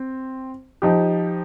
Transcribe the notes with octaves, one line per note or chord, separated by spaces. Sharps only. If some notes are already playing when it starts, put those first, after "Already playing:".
Already playing: C4
F3 D#4 G4